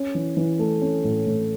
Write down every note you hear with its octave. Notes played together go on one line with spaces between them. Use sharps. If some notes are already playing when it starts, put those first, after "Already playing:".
Already playing: C#4
E3
E3
A3
C#4
A2
A2